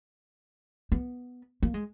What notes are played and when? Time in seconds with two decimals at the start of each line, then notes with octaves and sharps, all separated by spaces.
0.92 B3
1.63 A#3
1.74 G#3